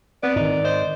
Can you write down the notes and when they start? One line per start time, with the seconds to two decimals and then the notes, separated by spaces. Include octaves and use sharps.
0.23 B3 C4 D5
0.36 G#2 D#3 D#4
0.65 C5 D#5